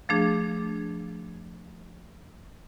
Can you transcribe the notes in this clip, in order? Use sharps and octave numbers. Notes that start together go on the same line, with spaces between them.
F3 A3 D4 G#4